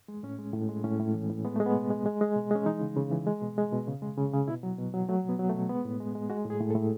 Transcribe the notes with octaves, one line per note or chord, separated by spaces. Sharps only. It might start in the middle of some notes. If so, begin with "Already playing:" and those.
G#3
A2 C#4
G#3
A2
G#3
A2 C#4
A2
E3
A2
G#3 B3
G#3 A3
B3
B2
G#3
G#3
G#3
B2
G#3 C#4
E3 D#4
C#3
C#3
E3
G#3
B2
G#3
B2
C#3
G#3
C#3
C#3
B2 E4
F#3
B2
F#3
F#3 A3
B2
B3
F#3
A3
B2
G#3 B3
A2
G#3
G#3
G#3 F#4
A2 G#4
A2
A4
A2